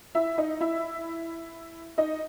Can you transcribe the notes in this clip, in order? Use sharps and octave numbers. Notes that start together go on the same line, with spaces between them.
E4 E5
D#4 D#5
E4 E5
D#4 D#5